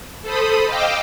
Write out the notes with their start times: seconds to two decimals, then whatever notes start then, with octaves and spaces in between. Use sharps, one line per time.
0.23 A4 C5 B5 D#6
0.66 D#5 F5 G5 D6 E6